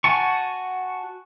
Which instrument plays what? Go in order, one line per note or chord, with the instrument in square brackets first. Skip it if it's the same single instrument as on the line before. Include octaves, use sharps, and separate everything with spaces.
[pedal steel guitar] F#4 F#5 G#5 A5 C#6